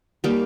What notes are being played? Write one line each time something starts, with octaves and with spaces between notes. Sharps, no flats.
G3 A#3 D#4 G4